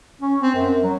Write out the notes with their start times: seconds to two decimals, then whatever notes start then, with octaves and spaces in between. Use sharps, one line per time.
0.22 C#4
0.42 C4
0.55 F#2
0.84 F#3